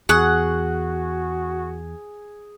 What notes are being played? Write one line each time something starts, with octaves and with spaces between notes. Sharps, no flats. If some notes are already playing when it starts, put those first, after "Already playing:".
E2 F#4 G#4 F#5 C#6